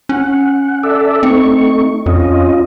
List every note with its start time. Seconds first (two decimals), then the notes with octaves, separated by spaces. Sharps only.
0.09 C#4 F#5
0.83 A4 D5 E5
1.23 A3 C4 D#4 C#6
2.06 F2 C#4 F4 D#5